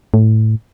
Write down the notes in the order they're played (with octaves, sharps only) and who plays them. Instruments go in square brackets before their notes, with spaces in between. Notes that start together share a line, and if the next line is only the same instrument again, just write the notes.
[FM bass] A2